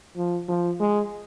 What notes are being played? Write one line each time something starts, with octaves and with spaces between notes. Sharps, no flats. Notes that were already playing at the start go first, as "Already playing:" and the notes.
F3
F3
G#3